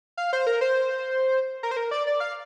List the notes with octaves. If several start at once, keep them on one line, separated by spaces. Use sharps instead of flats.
F5
C5
A#4
C5
A#4
C5
A#4
D5
D5
F5